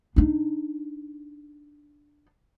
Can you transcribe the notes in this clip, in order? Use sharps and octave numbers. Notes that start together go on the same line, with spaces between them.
D4 D#4